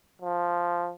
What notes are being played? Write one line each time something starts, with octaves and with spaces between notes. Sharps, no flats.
F3